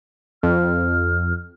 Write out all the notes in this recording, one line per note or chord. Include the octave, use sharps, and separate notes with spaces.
F2 F6